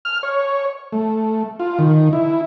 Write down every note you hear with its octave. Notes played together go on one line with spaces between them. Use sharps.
F6
C#5
A3
F4
D#3
E4